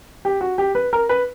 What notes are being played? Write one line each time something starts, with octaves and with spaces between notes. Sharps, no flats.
G4
F#4
G4
B4
A#4
B4